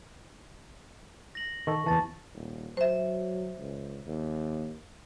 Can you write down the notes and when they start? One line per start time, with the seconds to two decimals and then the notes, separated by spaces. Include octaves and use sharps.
1.35 A#6 F#7
1.67 D#3 A4 C#6
1.86 E2 E3 A5 A6
2.34 D#1
2.77 F#3 C5 E5
3.59 C#2
4.06 D#2